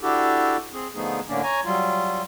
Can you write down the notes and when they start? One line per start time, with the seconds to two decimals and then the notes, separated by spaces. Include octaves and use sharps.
0.01 D4 E4 F#4 G4 A4
0.73 C4 G#4
0.95 D3 F3 A3 B3 D#4 G#4
1.28 A2 D3 A#3 C#4 D4
1.43 C#5 G#5 A#5
1.64 F#3 G3 F4